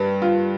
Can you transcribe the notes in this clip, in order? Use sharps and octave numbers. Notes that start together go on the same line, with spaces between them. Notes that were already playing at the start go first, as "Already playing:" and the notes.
Already playing: G2 B4
F4